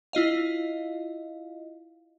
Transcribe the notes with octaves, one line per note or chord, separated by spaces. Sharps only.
E4 F4 D#5 F5